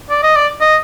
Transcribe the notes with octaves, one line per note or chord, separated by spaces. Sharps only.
D5
D#5
D5
D#5